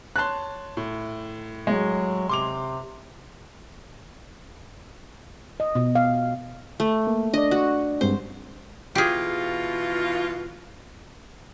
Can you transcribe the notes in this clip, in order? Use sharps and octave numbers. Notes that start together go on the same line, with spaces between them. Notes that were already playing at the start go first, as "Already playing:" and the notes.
C#5 A5 C6 F#6
A2
F#3 G#3
C3 C6 D6 F7
D#5
B2
F5
A3
A#3
D4 D5 D#5
F#4
G2 G#3 C4 C5
B2 E3 F4 G4 G#4